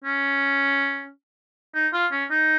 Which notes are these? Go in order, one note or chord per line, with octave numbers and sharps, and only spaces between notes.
C#4
D#4
F4
C#4
D#4